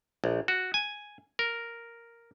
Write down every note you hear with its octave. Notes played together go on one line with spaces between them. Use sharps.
A#1
F#4
G#5
A#4